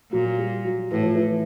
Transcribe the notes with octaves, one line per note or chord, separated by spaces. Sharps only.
A#2 F#3
G3
F#3
A2 E3
F3
E3